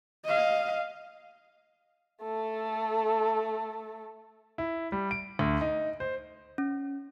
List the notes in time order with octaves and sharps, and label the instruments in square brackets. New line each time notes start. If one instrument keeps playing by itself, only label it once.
[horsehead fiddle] D#5 F5
[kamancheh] A3 A4
[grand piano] E4
G3
D7
D2
D#4
C5
[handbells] C#4